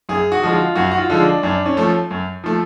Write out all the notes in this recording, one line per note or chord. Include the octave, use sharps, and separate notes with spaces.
F#2 G#4
F#4
D3 F3 G#3
F4
F#2 F#4
F#4
F4
D3 F3 G#3
D4
F#2 D4
C#4
F3 A3
F#2
F3 A3